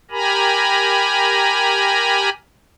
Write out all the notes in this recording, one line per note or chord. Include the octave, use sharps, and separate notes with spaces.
G4 A#4 G#5 A#5 B5